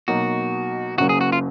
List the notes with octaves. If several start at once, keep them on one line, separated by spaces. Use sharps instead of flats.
B2 F#3 A#3 D#4 F#4
F#1 F#2 C#3 F#3 A#3 F#4
G#4
F#4
F4